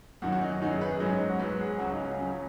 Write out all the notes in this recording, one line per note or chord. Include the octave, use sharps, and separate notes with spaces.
F#2 D#3 F#3 F#4
F#4
D#4
C#4
F#2 D#3 F#3 D#4
G#4
B4
G#4
G#2 F#3 D#4
C#4
D#4
F#4
G#2 F#3 B4
G#4
C#2 C#3 F#3 F#4
D#4
C#4
C#2 C#3 F#3 C#4